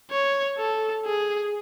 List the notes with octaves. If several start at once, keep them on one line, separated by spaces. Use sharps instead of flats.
C#5
A4
G#4